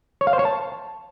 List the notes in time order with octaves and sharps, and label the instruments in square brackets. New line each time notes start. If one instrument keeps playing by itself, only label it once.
[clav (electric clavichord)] C#5
F5
C5
C#5
A5